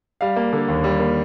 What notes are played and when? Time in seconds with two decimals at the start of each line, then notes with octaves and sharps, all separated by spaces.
0.21 G3 F5
0.36 A#3
0.53 D3
0.68 D#2
0.84 G3
1.00 A#3